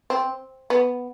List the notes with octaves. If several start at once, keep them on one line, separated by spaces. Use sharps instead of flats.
C4
B3